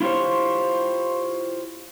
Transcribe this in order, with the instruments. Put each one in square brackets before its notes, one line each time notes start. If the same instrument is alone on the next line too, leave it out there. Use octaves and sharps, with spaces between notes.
[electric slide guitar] E4 F4 G4 C5 C#5